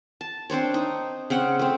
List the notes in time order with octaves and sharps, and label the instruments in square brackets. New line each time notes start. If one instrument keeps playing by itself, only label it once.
[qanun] A5
C4 D4 C5 C#5
D#4
C#3 C4 F#5
A3 C4